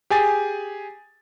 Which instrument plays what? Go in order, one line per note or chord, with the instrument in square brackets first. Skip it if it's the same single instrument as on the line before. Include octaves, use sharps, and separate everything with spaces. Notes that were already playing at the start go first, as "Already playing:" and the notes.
[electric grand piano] G4 G#4 G#5 A6